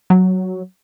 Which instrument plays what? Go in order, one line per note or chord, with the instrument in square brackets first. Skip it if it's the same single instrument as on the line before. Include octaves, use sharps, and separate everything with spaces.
[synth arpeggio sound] F#3